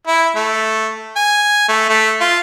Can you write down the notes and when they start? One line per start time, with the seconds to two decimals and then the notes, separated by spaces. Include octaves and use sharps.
0.07 E4
0.36 A3
1.16 G#5
1.69 A3
1.89 A3
2.21 F4